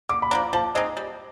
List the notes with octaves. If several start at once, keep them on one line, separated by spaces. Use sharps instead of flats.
D3 D6
B5
F3 A#3 D4 A#5
F3 A5
G#3 C4 D#4 D#5
G3